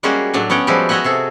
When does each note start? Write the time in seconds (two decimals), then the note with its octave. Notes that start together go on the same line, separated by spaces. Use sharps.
0.03 G3 G#3 A#3 C#4 F#4 G#4
0.34 A2 F#3 D4
0.50 B3 C#4 C#5 F#5 G5
0.67 F3 G3 G#3 E4 F#4 G4
0.89 F#4 C#5 D#5 E5 F#5 G#5
1.04 C3 G#4 A4